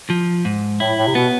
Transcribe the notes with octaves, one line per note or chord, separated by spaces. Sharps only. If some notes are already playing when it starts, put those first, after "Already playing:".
F3
G#2
A2 E4
A2
C3
B2 B3